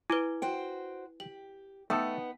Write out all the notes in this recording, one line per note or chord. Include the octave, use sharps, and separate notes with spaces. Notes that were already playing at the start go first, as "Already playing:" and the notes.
E4 B4 G#5 D6 D7 G7
F#4 C5 G5
G4 F#7
A3 B3 D#4 A4 G5 A5 D#6